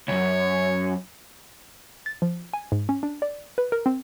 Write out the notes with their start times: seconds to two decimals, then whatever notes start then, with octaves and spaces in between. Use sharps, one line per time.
0.08 C#2 F#2 C#5
2.06 A6
2.22 F3
2.53 G#5
2.72 G#2
2.89 C#4
3.03 D4
3.22 D5
3.58 B4
3.72 A#4
3.86 C4